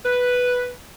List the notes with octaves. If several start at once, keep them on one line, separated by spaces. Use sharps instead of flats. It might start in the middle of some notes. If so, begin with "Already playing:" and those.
B4